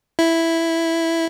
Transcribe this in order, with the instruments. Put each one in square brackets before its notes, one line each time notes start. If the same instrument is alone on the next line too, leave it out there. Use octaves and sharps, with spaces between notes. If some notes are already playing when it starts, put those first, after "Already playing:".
[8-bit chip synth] E4